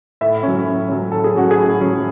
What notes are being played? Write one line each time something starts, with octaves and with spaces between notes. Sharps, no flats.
A2 E5
F#3 C#4
A2
F#3 C#4
A2 A4
G#4
F#3 C#4 F#4
G#4
A2
F#3 C#4